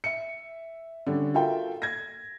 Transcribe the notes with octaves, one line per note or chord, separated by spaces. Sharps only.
E5 C#7
D3 G3 C#4
F4 F#4 A4 A#4 E5 G5
G#6 A#6